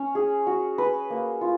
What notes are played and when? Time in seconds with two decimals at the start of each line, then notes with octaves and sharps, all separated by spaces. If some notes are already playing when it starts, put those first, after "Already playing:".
Already playing: C#4
0.15 G#4
0.47 F#4
0.78 B4
1.10 A#3
1.41 F4